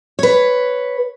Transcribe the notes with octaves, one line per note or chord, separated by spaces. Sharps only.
B4 C#5